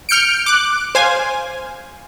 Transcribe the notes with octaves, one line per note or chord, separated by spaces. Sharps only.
F6 G6 C#7 D7
D6 F#6
C5 F5 G#5